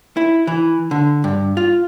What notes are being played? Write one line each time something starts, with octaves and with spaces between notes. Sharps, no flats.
E4
E3
D3
G2
F4